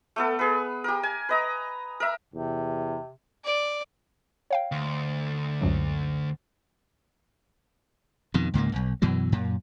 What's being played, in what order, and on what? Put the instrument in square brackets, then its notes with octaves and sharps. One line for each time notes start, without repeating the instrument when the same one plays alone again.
[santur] A3 B3 A4
G#4 B4
G4 A#4
G#5
B4 D#5 A#5
A#4 E5
[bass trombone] E2 [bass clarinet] C3
[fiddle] D5
[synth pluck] C#5 F5 G5
[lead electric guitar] D2
[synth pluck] C#2 F#2 F#3
[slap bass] F2 B2 D#3
C#2 G#2 C#3 A#3
E1 B1
F#2 B2 E3 F#3
F#2 A#2